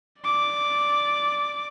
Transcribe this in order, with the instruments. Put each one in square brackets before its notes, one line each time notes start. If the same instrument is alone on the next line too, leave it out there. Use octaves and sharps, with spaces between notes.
[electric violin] D5 D6